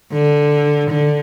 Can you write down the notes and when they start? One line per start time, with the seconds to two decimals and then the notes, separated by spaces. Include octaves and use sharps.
0.12 D3
0.90 D3